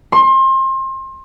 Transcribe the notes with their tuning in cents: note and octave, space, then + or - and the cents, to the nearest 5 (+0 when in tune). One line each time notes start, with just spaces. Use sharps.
C6 +30